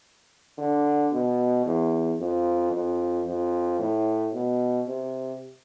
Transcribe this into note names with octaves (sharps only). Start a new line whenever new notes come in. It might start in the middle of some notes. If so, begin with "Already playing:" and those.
D3
B2
E2
F2
F2
F2
A2
B2
C3